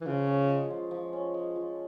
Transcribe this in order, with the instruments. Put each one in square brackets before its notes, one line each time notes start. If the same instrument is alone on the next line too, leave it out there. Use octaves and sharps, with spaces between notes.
[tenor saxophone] E3
[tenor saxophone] C#3 [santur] F3
[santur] C#4
G#3
F3
F3
C#4
G#3
F3